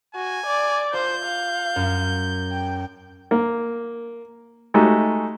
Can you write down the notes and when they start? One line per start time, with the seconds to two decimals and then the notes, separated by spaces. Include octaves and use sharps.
0.15 F#4 G#5
0.46 D5
0.93 F4 C5 G6
1.25 F5
1.76 F#2
2.52 G5
3.31 A#3
4.74 G#3 A3 D#4 F#4 G4